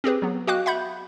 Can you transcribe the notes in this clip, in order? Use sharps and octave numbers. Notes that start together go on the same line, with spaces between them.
C4 G4 G#4 B4
F#3 B3
F#4 D#5 F5 G5 D6 F#6
E5 F#5 B5 G6